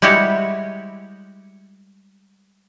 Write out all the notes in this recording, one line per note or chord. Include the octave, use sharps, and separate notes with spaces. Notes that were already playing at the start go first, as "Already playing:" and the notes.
G3 G#3 E4 F#4 G4 C#5